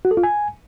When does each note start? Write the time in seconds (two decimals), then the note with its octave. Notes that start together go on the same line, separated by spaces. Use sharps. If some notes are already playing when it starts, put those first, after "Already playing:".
0.05 F#4
0.11 A4
0.17 F4
0.23 G#5